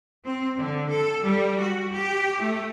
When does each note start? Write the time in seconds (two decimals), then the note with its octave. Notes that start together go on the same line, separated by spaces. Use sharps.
0.25 C4
0.58 D3
0.90 A4
1.23 G3
1.60 F#4
1.93 G4
2.41 A3